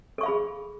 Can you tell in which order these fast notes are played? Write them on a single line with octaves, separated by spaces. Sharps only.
A4 C#6 F5 B5 G#4